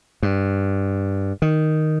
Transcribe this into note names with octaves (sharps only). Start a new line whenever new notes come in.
G2
D#3